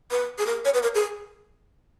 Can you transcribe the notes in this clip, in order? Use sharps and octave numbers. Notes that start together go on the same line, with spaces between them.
B4
G#4
A#4
C#5
B4
A#4
G#4